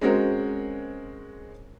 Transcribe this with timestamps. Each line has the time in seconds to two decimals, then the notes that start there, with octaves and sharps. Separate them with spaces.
0.01 G#3 C4 C#4 F#4 A#4 C5